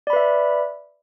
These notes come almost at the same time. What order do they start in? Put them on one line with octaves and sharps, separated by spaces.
D5 B5 B4 E5